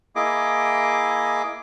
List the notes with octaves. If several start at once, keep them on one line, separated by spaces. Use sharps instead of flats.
A#3 E4 G#4 D#5 D6